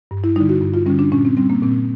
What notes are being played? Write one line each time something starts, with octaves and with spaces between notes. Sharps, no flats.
G2
E4
D3 G3 D#4
F#4
G2
F4
D3 G3 C#4
D4
A#2 C#4
C4
G3 C4
A#3
A#2 C4